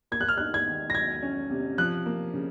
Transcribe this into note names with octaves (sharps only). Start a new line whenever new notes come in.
A#3 G#6
F#6
F6
D#4 F#6
G#6
D#3
A#6
F#3 G#6
C#4
C3
F3 F#6
A#3
C#3